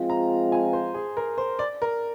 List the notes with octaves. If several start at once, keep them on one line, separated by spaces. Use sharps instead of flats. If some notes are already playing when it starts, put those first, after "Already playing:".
Already playing: F3 G#3 C4 F4
A#5
G#5
C5
G#4
A#4
C5
D5
A#4